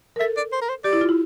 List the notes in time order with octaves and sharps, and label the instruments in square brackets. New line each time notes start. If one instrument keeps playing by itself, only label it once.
[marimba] A#4
[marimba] A4 [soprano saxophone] E5
[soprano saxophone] D5
C5
A#4
C5
[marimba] G4 [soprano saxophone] D5
[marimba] E4
F4
E4